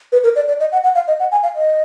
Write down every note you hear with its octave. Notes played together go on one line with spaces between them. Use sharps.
B4
A#4
D5
D5
D#5
F#5
F#5
F5
D#5
F#5
G#5
F5
D#5